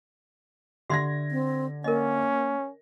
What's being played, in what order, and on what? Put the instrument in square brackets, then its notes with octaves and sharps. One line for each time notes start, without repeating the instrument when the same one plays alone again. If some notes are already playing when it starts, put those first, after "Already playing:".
[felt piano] D3 G#6 A#6 [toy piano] G4 E5 C6
[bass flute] C4
[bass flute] A#3 [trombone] C#4 [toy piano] A#4 D#5